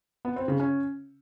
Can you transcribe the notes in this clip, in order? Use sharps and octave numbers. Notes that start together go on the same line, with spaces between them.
B3
C4
C#3
C#4